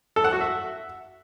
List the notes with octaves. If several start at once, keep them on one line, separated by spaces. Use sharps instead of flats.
A4
F#5
F#4
E5